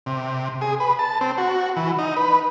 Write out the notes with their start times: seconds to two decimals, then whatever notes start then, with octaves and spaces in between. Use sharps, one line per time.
0.06 C3
0.61 G#4
0.80 B4
0.99 A5
1.21 C4
1.38 F#4
1.77 E3
1.99 D#4
2.17 B4